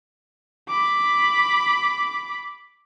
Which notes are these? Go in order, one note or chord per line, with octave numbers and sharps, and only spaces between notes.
B5 D6